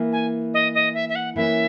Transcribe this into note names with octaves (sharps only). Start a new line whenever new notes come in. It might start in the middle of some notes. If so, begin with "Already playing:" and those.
Already playing: E3 A#3 E4
G#5
D#5
D#5
E5
E5
F#5
E3 A#3 C#4 E4 E5